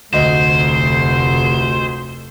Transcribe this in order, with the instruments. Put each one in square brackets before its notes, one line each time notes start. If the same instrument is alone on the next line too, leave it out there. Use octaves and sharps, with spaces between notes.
[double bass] F1 A3 [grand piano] D2 D#5 [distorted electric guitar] C5